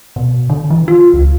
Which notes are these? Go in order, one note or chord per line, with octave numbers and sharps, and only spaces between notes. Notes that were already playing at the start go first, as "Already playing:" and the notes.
B2
D3
E3
F4
C#2